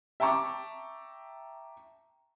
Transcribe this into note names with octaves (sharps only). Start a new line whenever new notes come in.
E5 G5 A5 A#5 C#6 D6